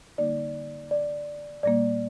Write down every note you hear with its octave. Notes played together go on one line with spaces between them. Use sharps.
D3 G3 A#3 D#4 D5
D5
A#2 G3 A#3 D5